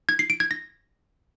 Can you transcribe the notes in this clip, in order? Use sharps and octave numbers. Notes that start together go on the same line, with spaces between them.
G#6
C7
D7
G#6
A#6